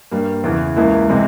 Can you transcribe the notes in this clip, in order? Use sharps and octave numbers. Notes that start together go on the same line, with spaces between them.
G2 G3 A#3
E2 C#3 E3
C#2 C#3 E3 A#3 E4
C3 E3 G#3